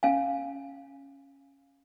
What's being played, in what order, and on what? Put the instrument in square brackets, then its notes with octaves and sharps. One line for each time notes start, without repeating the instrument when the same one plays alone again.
[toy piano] C#4 F5 G#5